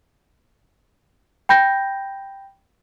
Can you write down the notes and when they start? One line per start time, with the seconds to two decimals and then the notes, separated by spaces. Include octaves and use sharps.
1.49 G5 B5 G6 A#6